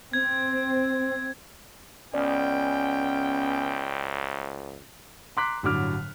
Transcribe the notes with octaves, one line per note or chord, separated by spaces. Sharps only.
C4 G#6
C#2 B3 C#4 D5 G5
A#5 C6 D6 F#6 B6
G1 A2 D3 F#3 D6 F6